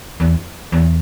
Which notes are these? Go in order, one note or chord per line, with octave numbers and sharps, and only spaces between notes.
E2
E2